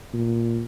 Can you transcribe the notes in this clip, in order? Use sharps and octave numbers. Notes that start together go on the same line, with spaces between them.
A#2